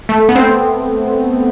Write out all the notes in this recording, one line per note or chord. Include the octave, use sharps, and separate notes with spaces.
A3
B3
C4